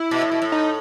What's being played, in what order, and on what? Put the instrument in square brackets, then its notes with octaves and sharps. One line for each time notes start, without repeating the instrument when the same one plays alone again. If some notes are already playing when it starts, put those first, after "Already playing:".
Already playing: [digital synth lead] E4
[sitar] B2
A2
B2
A2
[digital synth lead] D#4